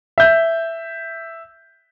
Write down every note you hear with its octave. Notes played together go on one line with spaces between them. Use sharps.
E5 G6